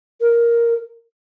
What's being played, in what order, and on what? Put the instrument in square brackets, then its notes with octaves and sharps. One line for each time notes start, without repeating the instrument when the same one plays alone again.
[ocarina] A#4